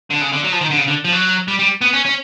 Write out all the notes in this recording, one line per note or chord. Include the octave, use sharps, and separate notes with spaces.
D3
C#3
D3
F#3
F3
D#3
D3
C#3
D3
F3
F#3
G3
G3
B3
C#4
C#4